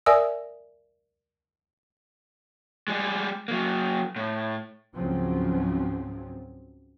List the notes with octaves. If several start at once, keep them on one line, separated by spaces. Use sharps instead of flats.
A#4 D5 E5 G#5 D#6 E6
G3 G#3
F#3 A#3
A2
C#2 G#2 C#3 F3 F#3 C4